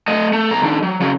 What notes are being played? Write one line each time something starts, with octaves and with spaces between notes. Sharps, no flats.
A3 D#5
A3
B1 A#5
D#3 D4
F#3
C#3 F#3